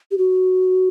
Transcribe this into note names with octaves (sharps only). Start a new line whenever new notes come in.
G4
F#4